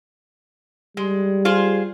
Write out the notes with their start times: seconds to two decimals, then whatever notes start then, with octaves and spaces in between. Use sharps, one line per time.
0.97 G3 G#3
1.45 F4 G#4 C5